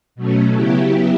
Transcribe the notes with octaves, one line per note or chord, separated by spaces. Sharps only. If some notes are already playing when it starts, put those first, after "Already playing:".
B2 F#3 A3 C#4
C#3 F#3 B3 E4 G4